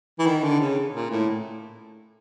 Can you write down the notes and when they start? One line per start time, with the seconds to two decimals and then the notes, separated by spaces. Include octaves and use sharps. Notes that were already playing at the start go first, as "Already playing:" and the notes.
0.19 E3
0.27 D#3
0.43 D3
0.60 C#3
0.94 A#2
1.11 A2